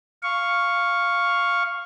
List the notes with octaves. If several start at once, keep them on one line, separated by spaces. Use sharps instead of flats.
F5 C#6